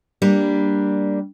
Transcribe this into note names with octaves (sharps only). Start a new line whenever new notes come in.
G3 A#3 D4